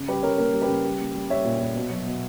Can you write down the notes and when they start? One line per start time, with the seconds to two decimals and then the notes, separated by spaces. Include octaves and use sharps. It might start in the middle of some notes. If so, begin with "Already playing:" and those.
Already playing: C#3
0.08 G3 G4 B4
0.23 C#3 A#4 C#5
0.38 A#3 A#4
0.53 G3
0.62 G4 B4
0.68 C#3
0.84 G3
1.00 A#3
1.15 G3
1.30 G3 C#5 E5
1.44 A#2
1.61 A#2
1.75 B2
1.90 F#3
2.06 B2